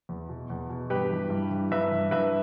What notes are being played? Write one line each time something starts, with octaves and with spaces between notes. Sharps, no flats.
E2
B2
E2
B2
G2 G4 B4
E3
G2
E3
G2 B4 E5
E3
G2 B4 E5